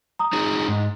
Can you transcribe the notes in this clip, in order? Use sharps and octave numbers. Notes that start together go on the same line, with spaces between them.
A#5 D#6
D#4 F#4 G#4
G#2